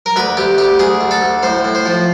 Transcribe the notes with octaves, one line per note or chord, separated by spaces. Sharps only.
A#4
D2 B4
D2 G4
D2 G4
D2 G#4
D2
A4
D2
A2 C5
A2
C5
F3